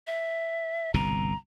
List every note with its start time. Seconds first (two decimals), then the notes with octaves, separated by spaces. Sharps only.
0.07 E5
0.94 G1 C2 B2 A#5